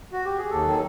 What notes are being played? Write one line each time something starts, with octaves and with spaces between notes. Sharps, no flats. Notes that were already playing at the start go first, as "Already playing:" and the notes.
F#4
G4
G#4
D#2 A4
D#3 F#3